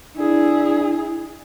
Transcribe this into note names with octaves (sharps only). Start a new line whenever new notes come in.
D4 E4 G#4